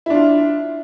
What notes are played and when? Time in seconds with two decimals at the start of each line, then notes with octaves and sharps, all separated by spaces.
0.06 E4
0.10 D4
0.14 F4